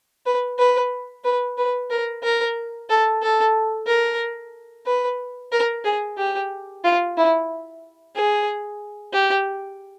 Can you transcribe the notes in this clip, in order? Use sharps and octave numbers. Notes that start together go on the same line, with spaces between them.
B4
B4
B4
B4
A#4
A#4
A4
A4
A#4
B4
A#4
G#4
G4
F4
E4
G#4
G4